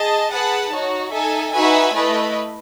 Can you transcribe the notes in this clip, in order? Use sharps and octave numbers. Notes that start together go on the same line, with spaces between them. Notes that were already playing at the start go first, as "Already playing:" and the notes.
Already playing: G#4 D#5 A5
G#4 B4 F#5 A5
D#4 F#4 C#5
D#4 A4 E5 G#5
D#4 F#4 B4 E5 G#5
A3 E4 B4 D#5